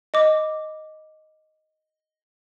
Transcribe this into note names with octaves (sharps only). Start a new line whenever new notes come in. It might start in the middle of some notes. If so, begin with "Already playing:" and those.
D#5 D6